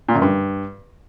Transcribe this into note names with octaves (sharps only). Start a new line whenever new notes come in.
A#2
F#2
G2